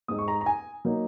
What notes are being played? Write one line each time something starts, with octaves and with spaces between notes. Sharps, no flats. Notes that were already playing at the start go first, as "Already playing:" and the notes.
G#2 G#3 D#4 D#6
C#6
A#5
A#5
G#5
F#3 A#3 D#4